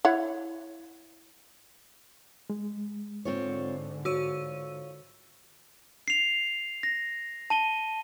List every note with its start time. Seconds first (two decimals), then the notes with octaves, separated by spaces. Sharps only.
0.05 E4 C#5 F#5
2.50 G#3
3.25 G#2 D3 C4 F4 C#5
4.05 F4 F#4 C#5 E6 D#7
6.08 C7 F7
6.83 A#6
7.50 A5 D#7 G7